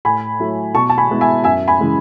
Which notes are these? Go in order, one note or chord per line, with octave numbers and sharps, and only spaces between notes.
A2 G#5 B5
F#3 A3 E4
B2 A5 C#6
A5
G#5 B5
G#3 B3 E4
E5 G#5
F#2 E5 G#5
G#5 B5
C#3 E3 G#3